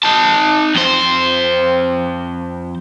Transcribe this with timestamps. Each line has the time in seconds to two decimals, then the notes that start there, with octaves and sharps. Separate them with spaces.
0.03 D#4 A5
0.75 F2 C5